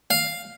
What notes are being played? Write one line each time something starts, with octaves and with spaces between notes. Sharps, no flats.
F5